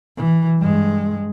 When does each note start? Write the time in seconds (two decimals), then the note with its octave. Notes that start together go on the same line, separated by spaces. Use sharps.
0.17 E3
0.59 G2 G#3